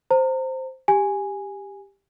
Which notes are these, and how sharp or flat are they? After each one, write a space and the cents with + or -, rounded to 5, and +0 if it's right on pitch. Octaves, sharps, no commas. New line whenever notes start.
C5 +0 A#5 -35
G4 +10 G#5 -5